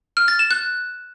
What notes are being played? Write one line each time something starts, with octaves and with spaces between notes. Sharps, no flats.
F6
A6
E7
F#6